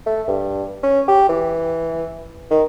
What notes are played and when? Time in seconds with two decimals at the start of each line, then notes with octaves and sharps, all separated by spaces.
0.06 A3
0.28 G2
0.83 C#4
1.08 G4
1.29 E3
2.51 D#3